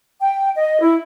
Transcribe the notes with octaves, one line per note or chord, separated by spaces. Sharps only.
G5
D#5
E4